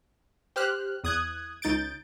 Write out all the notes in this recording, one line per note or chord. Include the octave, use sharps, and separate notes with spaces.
G4 C5 F6 F#6
E2 D#6 F#6 G#6
C#2 D#4 G6 A6 D7